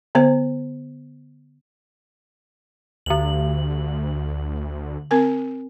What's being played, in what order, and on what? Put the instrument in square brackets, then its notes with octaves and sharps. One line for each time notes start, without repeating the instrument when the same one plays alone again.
[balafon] D3 B3 C5
[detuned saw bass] D2 [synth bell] D3 F#7
[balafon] C4 A#4 G#5